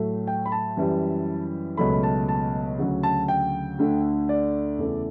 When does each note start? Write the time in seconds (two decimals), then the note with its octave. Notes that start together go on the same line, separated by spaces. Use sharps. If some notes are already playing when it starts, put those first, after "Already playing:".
Already playing: A2 F#3 A3
0.27 G5
0.46 B5
0.52 A5
0.77 F#2 E3 G3
1.77 C#2 B2 F#3 A3 B5
2.03 A5
2.29 A5
2.78 D2 C#3 F#3
3.03 A5
3.28 G5
3.79 D2 D3 A3
4.29 D5
4.79 E2 C#3 E3 A3